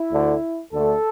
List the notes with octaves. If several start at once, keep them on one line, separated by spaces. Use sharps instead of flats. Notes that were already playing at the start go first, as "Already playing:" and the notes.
Already playing: E4
D2 D3 A3
D2 D3 A3 A4